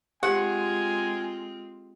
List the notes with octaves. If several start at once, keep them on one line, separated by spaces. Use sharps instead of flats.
G#3 C4 F4 G4 F#5 G#5